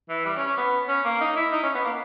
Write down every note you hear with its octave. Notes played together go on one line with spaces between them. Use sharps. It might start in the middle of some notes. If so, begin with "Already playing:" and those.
E3
G3
C#4
C#4
B3
C#4
A#3
D#4
E4
D#4
C#4
B3
A#3